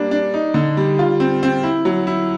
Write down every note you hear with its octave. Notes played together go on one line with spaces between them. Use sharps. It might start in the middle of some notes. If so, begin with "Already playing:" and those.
Already playing: G3 A#3 D4
D4
D#4
D3
G3
F4
C4
C4
E4
F#3
E4